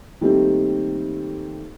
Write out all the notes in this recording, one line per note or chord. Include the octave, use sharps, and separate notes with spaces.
D#3 G3 A3 A#3 C4